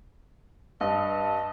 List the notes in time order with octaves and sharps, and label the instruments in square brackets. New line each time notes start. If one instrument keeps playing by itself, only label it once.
[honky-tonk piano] G2 [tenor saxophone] D#5 [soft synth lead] A5